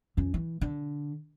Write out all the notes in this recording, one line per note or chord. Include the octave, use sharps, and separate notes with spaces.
F2 C#4
E3
D3